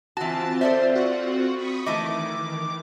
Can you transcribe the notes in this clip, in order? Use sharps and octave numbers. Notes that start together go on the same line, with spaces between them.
E3 C4 F4 F#4 A5
A4 C5 D5 E5
F#4
B5 C#6 D#6
D#3 E3 A3 E4 D#5 D6